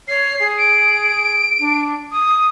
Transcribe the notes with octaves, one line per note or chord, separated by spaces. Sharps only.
C#5 C7
G#4
D7
D4
D#6